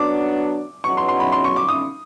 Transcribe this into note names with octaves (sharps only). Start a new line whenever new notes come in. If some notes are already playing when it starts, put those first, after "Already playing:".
Already playing: F#3 B3 D4 D6
E2 B2 F#3 C#6
C6
C6
B5
C6
C#6
D6
D#6